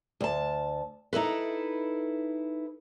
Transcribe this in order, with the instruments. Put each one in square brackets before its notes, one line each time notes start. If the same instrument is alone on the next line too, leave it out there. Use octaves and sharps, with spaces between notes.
[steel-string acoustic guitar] D2 A5
D#4 E4 A4 B4